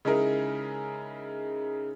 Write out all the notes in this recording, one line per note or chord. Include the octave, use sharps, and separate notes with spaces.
C#3 G#3 D#4 E4 G#4 A#4